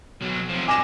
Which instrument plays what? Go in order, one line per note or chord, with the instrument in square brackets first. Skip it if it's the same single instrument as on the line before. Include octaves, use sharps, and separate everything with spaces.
[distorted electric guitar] B1 F#3
C3 F3
[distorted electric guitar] G2 [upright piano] G#5 A#6 E7 [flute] D6